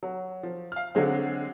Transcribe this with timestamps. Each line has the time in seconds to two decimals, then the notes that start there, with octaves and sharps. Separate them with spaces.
0.03 F#3
0.43 F3
0.72 F5 F6
0.95 D3 F#3 G#3 C4